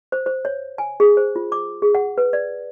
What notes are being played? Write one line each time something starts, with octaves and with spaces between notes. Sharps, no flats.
C5
C5
C#5
G#5
G#4
C5
F4
D6
G#4
F#5
B4
D5